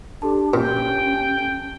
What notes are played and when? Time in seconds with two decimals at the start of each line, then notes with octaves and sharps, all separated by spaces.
0.22 D4 G4 A4 A5
0.54 A#2 C#4 G5